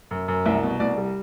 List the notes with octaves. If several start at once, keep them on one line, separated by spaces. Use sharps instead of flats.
F#2
F#2
C2 E5
B2
C2 D5
G3